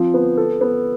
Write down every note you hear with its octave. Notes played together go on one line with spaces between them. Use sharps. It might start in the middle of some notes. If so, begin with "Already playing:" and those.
Already playing: F3 C4
B3
A4
B3